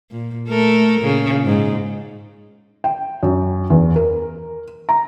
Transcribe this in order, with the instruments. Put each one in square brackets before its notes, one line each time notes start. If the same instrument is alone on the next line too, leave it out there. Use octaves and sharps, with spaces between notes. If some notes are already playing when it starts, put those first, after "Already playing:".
[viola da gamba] A#2
A3 A4 A#4
A#2 C#3
G#2
[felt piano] G5
F#2
E2
A#4
A#5